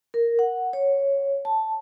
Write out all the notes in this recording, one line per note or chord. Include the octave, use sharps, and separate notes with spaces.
A#4
F#5
C#5
A5